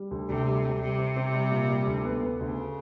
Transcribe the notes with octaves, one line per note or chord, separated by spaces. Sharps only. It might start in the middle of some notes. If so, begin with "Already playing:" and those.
Already playing: G3
D2
D2 C3
G3
G3
C3 G3
C4
C4
G3
A#2
G3
D2
B3
B3
D2 C#3